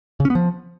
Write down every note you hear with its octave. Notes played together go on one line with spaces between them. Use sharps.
C#3
C#4
B3
F3